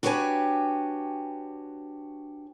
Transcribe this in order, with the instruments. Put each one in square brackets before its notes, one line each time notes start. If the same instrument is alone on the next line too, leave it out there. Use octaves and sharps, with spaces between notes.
[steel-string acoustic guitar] D4 F#4 G4 B4 C#5 G#5